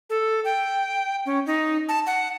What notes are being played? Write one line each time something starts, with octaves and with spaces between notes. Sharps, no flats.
A4
G5
C#4
D#4
A5
F#5